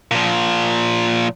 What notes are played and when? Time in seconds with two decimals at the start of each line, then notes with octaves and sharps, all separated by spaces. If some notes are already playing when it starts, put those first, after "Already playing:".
0.11 A#2 F3